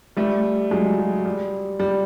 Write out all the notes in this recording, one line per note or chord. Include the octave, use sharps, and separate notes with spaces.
G3 A3
F#3 G#3
F#3
G3
G3